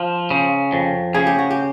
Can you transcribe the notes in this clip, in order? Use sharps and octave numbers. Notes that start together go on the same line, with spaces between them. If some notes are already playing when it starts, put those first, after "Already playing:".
Already playing: F3
C#3
F2
C#3 G#4
G4
F#4
G4